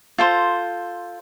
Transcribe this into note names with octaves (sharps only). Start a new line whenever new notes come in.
F4 A4 C5